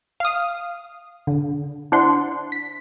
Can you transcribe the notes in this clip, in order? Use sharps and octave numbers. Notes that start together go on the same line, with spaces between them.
F5 D#6
D3
D4 E4 C5 F#5 C6
B6